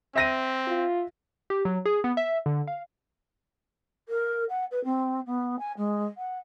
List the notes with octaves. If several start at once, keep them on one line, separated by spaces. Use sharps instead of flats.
C4 E5 A#6 D#7
F4
G4
F#3
G#4
B3
E5
D3
F5
A#4
F#5
B4
C4
B3
G#5
G#3
F#5